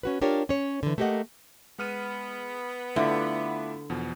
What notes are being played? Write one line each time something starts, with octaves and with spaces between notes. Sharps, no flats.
C#4 F#4 B4
D4 F4 G4 A#4 C#5
C#4 C#5
D3 E3
A3 A#3 G4 C5 D#5 F#5
G#3 B3 F6 D#7
D3 A3 E4 F4 F#5 B5 D6
E2 B2 F3